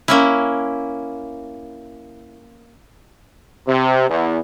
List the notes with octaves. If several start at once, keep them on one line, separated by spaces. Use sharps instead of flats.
A#3 C#4 E4
C3
E2